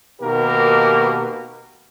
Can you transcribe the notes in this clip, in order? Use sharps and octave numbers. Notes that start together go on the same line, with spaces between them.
B2 D#3 A#3 G4 A#4